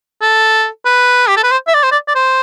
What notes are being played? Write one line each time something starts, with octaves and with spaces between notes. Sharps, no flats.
A4
B4
G4
A4
B4
C5
E5
D5
C5
D5
D5
C5